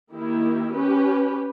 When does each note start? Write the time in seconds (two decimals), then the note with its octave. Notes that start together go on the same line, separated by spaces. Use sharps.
0.12 D#3 A#3 E4 G4
0.74 C#4 G4 B4